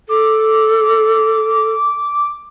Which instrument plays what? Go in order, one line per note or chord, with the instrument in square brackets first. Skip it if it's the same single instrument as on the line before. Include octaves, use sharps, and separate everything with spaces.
[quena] A4 [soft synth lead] D6